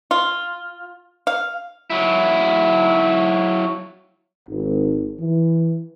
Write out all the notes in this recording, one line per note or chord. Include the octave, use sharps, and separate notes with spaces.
F4
F5
F#3 E4
G#1
E3